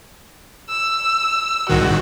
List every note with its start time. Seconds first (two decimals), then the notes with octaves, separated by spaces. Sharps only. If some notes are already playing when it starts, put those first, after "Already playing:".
0.69 E6
1.70 C2 G#2 D#3 F#4